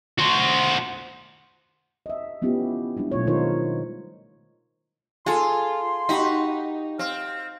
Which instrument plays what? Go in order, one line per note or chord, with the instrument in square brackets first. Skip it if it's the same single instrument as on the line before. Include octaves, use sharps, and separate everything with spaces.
[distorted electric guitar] F#4 C5
[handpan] D#5 E5
A3 B3 C#4 E4 F4 G4
G3 G#3 D4 E4
B2 F#3 A3 F4 C#5
D#3 D#4 F4 A#4 C5 C#5
[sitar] F4 [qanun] G#4 A4 [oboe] C6
[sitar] D#4 [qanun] F#4 G4 B5
[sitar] C4 [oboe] F5